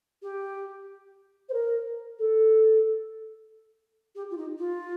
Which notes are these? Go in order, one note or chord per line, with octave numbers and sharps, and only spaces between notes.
G4
C5
A#4
A4
G4
F4
D#4
F4